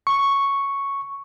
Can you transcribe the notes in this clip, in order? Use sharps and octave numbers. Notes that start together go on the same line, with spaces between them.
C#6